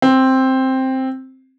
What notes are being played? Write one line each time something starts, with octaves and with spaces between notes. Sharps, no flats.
C4